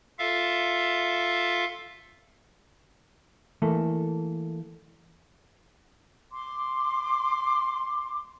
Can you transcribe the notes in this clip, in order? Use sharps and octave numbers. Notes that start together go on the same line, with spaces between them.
F4 A4 E5 F5
E3 A3 A#3 A4
C6 D6